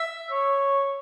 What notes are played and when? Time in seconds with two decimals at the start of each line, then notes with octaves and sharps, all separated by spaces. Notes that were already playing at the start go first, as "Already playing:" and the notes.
Already playing: E5
0.31 C#5